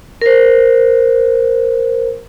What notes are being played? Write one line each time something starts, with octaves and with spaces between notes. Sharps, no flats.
A#4 C5